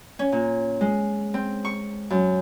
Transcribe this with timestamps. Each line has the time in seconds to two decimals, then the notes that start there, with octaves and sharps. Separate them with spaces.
0.19 C#4
0.32 A#2
0.81 G#3
1.34 C4
1.65 C#6
2.10 F#2